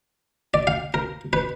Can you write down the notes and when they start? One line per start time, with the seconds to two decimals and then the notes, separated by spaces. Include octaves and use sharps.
0.54 D5
0.67 F5
0.94 A#4
1.33 B4